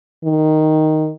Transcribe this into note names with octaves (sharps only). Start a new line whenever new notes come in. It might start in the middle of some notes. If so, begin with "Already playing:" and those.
D#3